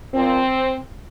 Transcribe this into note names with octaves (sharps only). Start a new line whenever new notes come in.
A#2 F3 C4